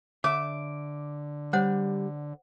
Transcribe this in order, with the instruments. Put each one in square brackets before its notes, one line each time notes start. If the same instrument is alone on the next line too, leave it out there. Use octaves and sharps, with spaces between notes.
[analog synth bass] D3 [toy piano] C#5 [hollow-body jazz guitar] E5 [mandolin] D6
[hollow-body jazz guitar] G3 [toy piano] C5 C#5 F#5